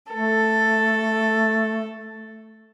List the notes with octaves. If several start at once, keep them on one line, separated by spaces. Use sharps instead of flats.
A3 A4